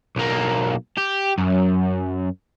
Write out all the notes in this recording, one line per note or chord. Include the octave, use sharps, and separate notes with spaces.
B1 A#3
G4
F#2